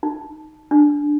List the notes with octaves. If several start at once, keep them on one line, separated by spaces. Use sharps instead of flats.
D#4
D4